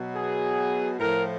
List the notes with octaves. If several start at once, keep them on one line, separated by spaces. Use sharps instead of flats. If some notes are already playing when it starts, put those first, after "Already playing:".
Already playing: B2 F#3
G#4
A2 F3 A#4